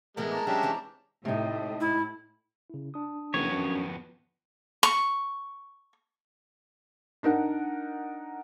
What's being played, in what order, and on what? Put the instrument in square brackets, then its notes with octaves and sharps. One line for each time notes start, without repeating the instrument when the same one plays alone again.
[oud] A2 E3 B3 [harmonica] G#3 A#4
[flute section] A5 A#5 D6
[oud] F#3 [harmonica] G#3 E5 [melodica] C#4 D4 G4
[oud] E3 C4 C#5
[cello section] A2 [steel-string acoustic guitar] C3 D#4
[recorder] E4
[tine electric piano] C#3 E4
D4 D#6
[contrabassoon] F#1 [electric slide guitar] F2 B3 [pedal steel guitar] C#5
[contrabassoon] F#2
[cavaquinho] C#6
[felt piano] D4 D#4 A#4 F#5